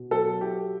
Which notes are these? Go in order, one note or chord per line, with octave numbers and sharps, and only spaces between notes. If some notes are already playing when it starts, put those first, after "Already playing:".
Already playing: B2
F#3 A4
E4 G4